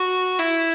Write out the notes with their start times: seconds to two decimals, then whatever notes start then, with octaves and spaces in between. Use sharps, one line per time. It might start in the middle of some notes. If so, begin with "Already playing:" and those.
Already playing: F#4
0.39 E4